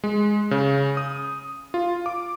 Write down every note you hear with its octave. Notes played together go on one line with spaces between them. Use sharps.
G#3
C#3
D#6
F4
D6